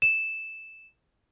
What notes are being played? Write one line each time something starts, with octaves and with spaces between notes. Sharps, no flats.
E7